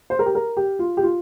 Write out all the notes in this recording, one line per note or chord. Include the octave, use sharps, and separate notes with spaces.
C5
A#4
G4
A#4
G4
F4
G4
F4